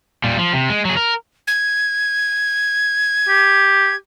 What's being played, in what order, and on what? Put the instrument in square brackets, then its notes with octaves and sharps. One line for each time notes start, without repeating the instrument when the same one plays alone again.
[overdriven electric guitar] A#2 G3
F3
C3
G#3
F#3 G#4
A#4
[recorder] G#6
[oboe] G4